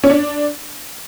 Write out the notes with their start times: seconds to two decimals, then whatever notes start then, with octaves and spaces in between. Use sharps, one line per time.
0.04 C#4
0.10 D4